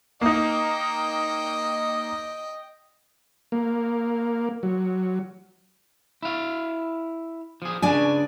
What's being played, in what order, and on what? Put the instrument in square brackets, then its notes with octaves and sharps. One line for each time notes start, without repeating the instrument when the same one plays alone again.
[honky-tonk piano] A#3 D#4 [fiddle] D#5 G5
[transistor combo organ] A#3
F#3
[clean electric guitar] E4 F5
F3 G#4
[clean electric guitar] C#2 C#3 [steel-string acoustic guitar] D4 D5 G#5